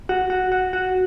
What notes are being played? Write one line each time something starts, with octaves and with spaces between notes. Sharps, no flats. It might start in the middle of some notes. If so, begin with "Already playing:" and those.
F#4
F#4
F#4
F#4